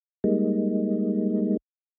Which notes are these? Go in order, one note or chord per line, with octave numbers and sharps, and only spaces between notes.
G3 G#3 A#3 D#4